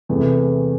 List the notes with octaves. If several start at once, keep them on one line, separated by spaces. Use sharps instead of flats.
E2 C3 E3 A3